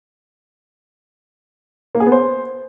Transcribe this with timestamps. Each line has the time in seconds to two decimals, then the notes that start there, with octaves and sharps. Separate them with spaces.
1.95 A#3
2.00 G#4
2.06 B3
2.12 C5